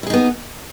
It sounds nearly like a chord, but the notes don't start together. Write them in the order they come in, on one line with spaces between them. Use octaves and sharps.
E4 G#4 D#4 B3